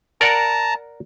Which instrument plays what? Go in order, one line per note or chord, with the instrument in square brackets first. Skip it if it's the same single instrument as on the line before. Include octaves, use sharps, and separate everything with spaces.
[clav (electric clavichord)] A#4 D5 F#5 [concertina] A5 A#5